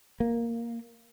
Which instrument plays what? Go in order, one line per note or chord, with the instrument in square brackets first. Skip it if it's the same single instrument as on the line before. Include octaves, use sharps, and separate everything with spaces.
[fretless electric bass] A#3